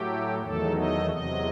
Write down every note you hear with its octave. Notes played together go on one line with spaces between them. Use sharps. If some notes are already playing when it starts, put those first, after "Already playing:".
Already playing: A2 F#3 A3 G4
E2 D#3 F#3 A3 A4
D#5
E2 C3 F#3 D#5